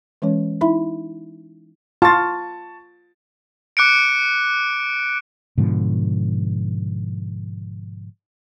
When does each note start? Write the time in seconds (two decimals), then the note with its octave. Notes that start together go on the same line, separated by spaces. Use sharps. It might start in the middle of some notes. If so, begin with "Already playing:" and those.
0.22 E3 G#3 C#4 C#5
0.61 D#4 E4 E5 B5
2.02 F4 A5 C#6 A6
3.77 D6 F#6 C#7 D7
5.58 G#2 B2 D3 F3